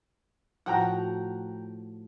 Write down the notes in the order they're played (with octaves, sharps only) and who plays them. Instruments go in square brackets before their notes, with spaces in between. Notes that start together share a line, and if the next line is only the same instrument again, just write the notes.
[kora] A2 F3 F#4 [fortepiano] F#5 G5 A#5